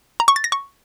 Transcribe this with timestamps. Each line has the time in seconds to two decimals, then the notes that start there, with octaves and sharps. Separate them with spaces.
0.20 A#5
0.28 C#6
0.36 A6
0.44 A#6
0.52 C#6